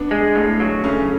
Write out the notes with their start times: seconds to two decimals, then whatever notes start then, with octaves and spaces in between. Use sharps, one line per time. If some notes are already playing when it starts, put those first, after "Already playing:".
Already playing: B3 D4
0.11 G#3
0.35 A2
0.60 F#3
0.84 C#3 A3 C#4